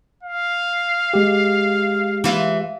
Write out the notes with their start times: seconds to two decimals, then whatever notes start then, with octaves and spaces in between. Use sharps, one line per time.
0.23 F5
1.14 G#3 G4
2.24 E3 F4